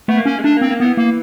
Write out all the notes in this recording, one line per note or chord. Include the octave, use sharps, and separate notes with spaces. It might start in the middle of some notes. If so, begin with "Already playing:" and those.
A3 B3
A#3
C#4
G#3
A3 D4
A#3 C4
A#3
E3 B3
A#3